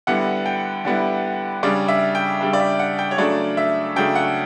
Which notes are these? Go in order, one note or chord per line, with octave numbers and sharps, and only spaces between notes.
D3 G3 B3 E4 F#5
G5
D3 G3 B3 E4
C#3 G3 D4 D5
E5
G5
C#3 G3 D4
D5
E5
F#5
G5
C#5
C#3 F#3 A3 D4 D5
E5
C#3 F#3 A3 D4 G5
F#5